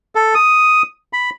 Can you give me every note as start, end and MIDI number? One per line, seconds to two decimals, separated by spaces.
0.15 0.35 69
0.35 0.82 87
1.13 1.30 83